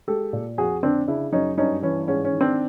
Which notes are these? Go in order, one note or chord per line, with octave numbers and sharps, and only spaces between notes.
G#3 G4 A4
A#2
F2 F#4 G#4
D3 C4 D4
C#3 D4 E4
F#2 C#4 D#4
G2 C#4 D#4
E3 C#4
G#2 C#4
C#4
D#3
C4 D4